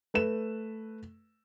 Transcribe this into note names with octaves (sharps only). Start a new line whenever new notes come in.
A3 B4 E7